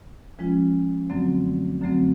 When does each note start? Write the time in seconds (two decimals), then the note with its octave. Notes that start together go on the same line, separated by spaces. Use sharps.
0.39 F3 G#3 C#4 F4
1.09 F#2 D3 F#3 A3 C4
1.81 F#2 D3 F#3 A3 C4